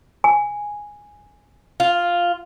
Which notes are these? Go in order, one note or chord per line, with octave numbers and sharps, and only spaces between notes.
G#5
F4